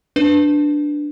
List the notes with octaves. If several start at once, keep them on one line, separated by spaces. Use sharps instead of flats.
D4 B4